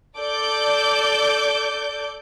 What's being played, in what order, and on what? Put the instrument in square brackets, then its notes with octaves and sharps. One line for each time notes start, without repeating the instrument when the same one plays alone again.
[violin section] A4 D5 D6 G6